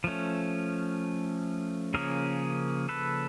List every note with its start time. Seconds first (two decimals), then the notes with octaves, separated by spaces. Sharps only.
0.04 F3 A3 C#4
1.94 C#3 F3 A#3 C#4 G#4 A#4
2.89 A4 B4